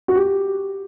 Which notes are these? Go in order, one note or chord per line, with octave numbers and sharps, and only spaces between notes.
F#4
G4